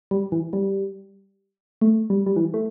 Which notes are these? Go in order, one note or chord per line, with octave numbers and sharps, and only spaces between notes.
G3
E3
G3
A3
G3
G3
E3
A3